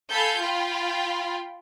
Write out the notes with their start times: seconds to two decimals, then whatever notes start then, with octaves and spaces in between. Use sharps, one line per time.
0.10 A4 F5 G#5 B5 G6
0.39 F4 G5 B5